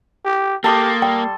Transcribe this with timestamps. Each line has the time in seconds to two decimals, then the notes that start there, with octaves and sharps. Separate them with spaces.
0.25 G4
0.64 A#3 G4 A4 C6 D#6
1.02 G3 G5